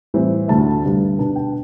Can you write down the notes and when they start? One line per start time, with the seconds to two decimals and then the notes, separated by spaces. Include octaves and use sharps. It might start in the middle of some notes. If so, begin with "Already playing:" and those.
0.14 A2 E3 G3 C4
0.48 D2 D3 A3 A5
0.84 G2 D3 G3 B3
1.19 B2 B3 D4 A5
1.36 G5